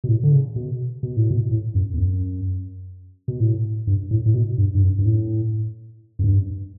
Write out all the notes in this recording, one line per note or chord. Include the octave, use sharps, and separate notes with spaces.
B2
A2
D3
C#3
B2
B2
A2
B2
A2
F#2
E2
F#2
B2
A2
G2
A2
A2
B2
G2
G2
F#2
G2
A2
F#2
G2